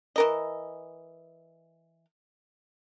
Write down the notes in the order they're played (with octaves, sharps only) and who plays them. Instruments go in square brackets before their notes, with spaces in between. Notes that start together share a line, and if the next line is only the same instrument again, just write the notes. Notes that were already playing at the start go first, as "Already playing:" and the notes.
[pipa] E3 A#4 D#5